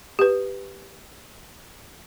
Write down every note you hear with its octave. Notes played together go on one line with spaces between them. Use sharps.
G4 B4